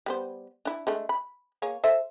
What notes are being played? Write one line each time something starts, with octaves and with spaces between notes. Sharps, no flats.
G3 B3 C5
D4 E4
G#3 A3 D4
B5
A#3 G#4 C#5
A4 C5 E5